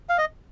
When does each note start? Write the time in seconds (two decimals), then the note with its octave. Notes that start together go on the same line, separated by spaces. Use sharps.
0.09 F5
0.18 D#5